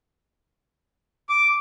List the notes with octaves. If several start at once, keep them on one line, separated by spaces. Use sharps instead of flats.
D6